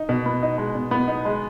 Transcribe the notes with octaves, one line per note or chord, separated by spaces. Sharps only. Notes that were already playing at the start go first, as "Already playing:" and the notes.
Already playing: D#4
B2
B3
D#4
G#3
B2
B3
D#4
G#3